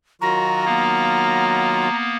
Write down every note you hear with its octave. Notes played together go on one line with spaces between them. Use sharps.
D#3 F#3 F4 F#4 A#5
A#3 B3